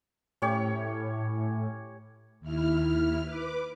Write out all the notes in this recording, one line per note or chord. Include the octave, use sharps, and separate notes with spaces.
A2 C#4 G4 C#5
D#2 E4 F6
B4 D6